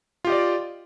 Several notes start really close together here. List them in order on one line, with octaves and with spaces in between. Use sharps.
F4 G4 D#5 D5